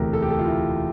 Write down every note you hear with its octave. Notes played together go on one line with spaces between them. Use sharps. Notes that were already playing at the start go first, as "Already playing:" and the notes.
Already playing: E1 D2 C3 E3 G4 A4 A#4
A4
G4
A4
F4
E4